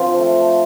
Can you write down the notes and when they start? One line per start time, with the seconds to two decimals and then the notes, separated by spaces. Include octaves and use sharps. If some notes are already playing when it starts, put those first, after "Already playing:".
Already playing: F3 C4 D4 F4
0.19 A3